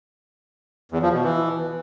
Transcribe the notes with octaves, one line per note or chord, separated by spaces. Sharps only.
E2
F3
B2
E3